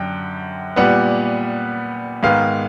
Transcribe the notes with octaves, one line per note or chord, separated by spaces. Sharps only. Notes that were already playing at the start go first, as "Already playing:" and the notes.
Already playing: F#2 D3 G5
A#2 G3 B3 F#5
G#2 D#3 G#3 B3 F5